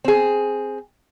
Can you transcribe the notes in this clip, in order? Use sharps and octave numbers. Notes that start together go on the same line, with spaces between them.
C4 G#4